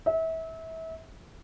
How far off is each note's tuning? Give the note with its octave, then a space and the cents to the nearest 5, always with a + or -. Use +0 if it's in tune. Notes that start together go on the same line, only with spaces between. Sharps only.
E5 -30